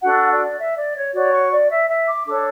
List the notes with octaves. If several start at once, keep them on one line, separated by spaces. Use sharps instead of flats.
D4 F#4 A4 F#5
D5
E5
D5
C#5
F#4 C#5 D5
C#6
D5
E5
E5
D6
D4 A4 C#5 D6